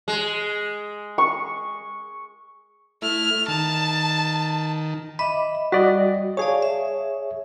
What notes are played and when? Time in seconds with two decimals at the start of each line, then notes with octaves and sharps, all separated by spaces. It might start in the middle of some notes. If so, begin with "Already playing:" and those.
0.08 G#3
1.18 C#6
3.02 A3 E4 F6
3.48 D#3 A5
5.19 D#5 E5 B5 D6
5.72 G3 F#4 D5 D#5
6.37 G#4 C#5 D5 F5 A5
6.62 E5